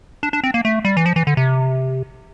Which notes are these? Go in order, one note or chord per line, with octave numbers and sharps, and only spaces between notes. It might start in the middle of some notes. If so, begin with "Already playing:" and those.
D4
D4
C4
A#3
A3
G3
E3
F3
E3
D3
C3